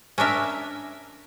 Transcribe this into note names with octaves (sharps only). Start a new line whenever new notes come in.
C#4 D4 A#4 E5